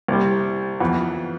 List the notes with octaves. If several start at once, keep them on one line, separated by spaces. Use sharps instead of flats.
C2 C3 G3
F2 E3 B3